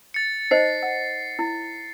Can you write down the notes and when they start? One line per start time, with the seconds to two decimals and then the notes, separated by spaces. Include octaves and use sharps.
0.14 A6 C#7
0.51 D#4 C5 D#5 C7
0.83 F#5
1.39 E4